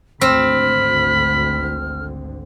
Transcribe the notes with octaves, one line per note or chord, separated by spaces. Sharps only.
G#1 D2 D3 C4 B5 F6